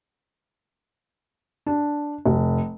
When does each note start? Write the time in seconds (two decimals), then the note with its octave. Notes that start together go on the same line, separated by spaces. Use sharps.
1.66 D4
2.26 F1